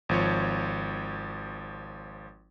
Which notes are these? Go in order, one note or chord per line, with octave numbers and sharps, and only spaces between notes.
G#1 F3 C#5